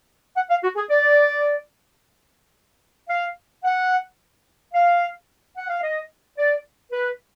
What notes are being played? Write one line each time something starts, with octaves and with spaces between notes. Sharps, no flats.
F#5
F5
F#4
G#4
D5
F5
F#5
F5
F#5
F5
D#5
D5
B4